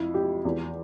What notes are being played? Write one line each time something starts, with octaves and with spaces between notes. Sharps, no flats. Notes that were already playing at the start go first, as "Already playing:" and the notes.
Already playing: F2 E4
G4
E2